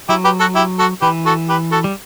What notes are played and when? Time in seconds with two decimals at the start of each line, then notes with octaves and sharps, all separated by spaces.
0.09 F#3 E4 G4
0.24 G4 B4
0.39 F#4 A4
0.55 E4 G4
0.78 F#4 A4
1.02 E3 G4 B4
1.26 F#4 A4
1.49 G4 B4
1.72 F#4 A4
1.84 G3